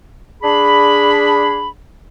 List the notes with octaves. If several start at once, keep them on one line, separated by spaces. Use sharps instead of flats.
D4 G#4 B5